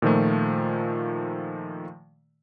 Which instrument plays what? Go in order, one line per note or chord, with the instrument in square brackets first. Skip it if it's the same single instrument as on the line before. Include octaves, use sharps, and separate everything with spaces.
[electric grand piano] A#2 D#3 F3 A3